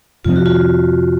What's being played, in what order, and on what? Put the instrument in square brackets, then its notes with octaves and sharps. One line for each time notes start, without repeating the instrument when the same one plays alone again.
[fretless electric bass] F2 C3 F3 C4 [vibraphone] F4
[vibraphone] F#4
F4